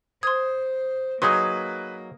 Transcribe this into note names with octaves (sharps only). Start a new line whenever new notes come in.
C5 C6 D#6 G#6
F#3 A#3 D#4 G#4 B4 C6